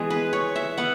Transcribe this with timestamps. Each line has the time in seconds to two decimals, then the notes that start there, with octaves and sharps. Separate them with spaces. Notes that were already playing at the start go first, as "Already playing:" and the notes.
Already playing: E3 G#3 B3 G#4
0.10 B4
0.33 C#5
0.56 E5
0.77 B3 F#5